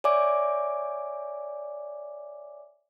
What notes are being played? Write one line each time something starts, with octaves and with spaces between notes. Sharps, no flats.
C#5 D5 E5 G#5 D6